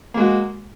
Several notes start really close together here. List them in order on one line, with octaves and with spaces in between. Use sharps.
A#3 G#3 F#4